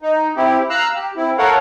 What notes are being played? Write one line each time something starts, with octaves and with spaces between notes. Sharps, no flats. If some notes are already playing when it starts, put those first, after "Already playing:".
D#4
C4 E4 G4
F5 A#5 E6 F#6
G4
C4 E4
A4 A#4 C#5 F5 F#5